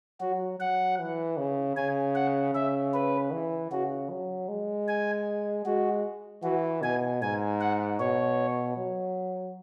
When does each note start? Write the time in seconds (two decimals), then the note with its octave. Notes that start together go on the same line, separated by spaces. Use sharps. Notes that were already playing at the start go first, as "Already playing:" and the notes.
0.20 F#3 F#4
0.59 F#3 F#5
0.99 E3
1.37 C#3
1.76 C#3 G#5
2.15 F#5
2.54 C#3 E5
2.94 B4
3.31 E3
3.71 C#3 F#4
4.10 F#3
4.49 G#3
4.88 G#5
5.66 G#3 F#4
6.43 E3 F#4
6.82 B2 G#5
7.21 G#2 G#5
7.61 F#5
7.99 B2 C#5
8.77 F#3